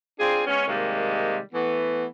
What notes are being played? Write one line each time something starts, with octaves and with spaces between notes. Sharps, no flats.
C4 D4 F4 G#4
G#3 B3 C#4
C3 D#3 G3 G#3 A#3
E3 A3 B3